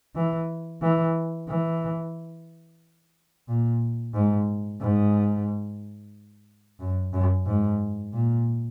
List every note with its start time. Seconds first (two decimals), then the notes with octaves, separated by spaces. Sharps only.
0.16 E3
0.82 E3
1.48 E3
3.48 A#2
4.14 G#2
4.80 G#2
6.80 F#2
7.14 F#2
7.46 G#2
8.13 A#2